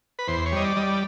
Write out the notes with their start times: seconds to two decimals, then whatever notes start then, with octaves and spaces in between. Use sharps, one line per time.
0.19 B4
0.28 E2 C5
0.46 C#5
0.52 G3 D#5
0.64 D5
0.76 G3 D#5
0.83 D5